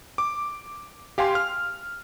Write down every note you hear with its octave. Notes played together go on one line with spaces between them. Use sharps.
D6
G4 F5 G#5 C6
F6